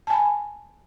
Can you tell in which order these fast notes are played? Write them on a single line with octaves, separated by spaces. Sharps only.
A5 G#5 B5